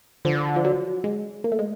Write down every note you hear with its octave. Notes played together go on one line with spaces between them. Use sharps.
D3 F3
F3
F#3
G#3
A#3
A3
G#3